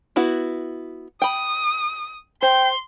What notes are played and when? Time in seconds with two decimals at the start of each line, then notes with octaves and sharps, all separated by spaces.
0.16 B3 E4 F#4
1.22 G5 B5 D#6
2.42 C5 G5 C6